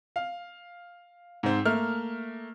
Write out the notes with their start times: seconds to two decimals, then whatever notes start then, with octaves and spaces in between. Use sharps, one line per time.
0.16 F5
1.43 G#2 C4
1.65 A3 A#3 F6